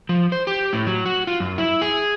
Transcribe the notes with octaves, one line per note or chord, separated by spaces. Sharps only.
F3
C5
G4
A2
F#3
F#4
F4
F#2
E4
G#4